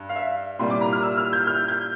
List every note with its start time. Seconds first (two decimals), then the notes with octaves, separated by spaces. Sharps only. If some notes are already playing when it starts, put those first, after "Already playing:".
Already playing: G2
0.09 F5
0.16 E5
0.59 C2 A#2 G3 C4 F4 C6
0.70 D6
0.81 A#5
0.93 F6
1.03 E6
1.17 F6
1.33 G6
1.47 F6
1.68 G6